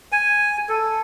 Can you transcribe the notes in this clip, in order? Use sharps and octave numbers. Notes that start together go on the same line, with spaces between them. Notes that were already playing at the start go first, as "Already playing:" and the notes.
G#5
A4